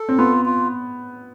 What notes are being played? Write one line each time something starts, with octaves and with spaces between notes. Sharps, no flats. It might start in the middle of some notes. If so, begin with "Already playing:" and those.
Already playing: A4
C4
B3 F4
F4